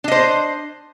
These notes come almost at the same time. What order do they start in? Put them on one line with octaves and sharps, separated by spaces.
D4 D#5 C5